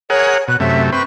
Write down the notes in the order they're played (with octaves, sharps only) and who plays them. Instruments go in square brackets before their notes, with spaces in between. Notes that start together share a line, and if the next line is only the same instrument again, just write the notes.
[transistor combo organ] G#4 A#4 F#5 [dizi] C#5
[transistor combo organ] B2 [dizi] F#6
[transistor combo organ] F#2 C3 A3 [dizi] E5
[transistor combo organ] C4 B4 [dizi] C#6